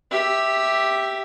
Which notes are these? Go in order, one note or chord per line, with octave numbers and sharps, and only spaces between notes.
G4 E5